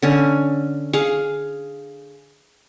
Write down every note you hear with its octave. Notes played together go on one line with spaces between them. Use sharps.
D3 C#4
G#4 F5